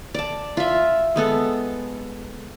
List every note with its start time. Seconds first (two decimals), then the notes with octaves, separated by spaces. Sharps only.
0.14 D5 A5
0.57 F4 E5
1.16 G#3 B3 A4